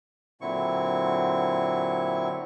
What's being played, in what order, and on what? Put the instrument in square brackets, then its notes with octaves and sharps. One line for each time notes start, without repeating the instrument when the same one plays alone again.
[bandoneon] A#2 D3 F#3 C4 E4 C#6